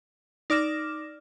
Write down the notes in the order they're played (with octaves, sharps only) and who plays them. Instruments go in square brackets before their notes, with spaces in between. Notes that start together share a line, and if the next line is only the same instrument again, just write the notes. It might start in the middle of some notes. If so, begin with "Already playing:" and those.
[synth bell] D#4 D5 D6 F6 A#6 E7